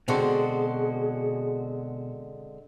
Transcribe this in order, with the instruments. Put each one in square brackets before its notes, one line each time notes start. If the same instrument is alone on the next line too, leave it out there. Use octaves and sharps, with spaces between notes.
[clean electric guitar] B2 F#4 [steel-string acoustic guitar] D3 G#3 C4 [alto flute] G#4